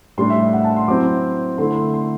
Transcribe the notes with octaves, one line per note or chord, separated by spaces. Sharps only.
A2 G3 D4 C6
E5
E5
F#5
A5
C6
F#3 C4 E4 D6
D3 A3 E4 C6
C6
C6